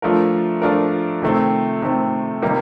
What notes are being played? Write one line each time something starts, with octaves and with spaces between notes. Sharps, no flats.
F3 A3 D4 F4 A#4
F3 A3 D4 F4 A#4
C3 D#3 A3 C4
C3 D#3 A3 C4
C3 D#3 G3 A#3 D#4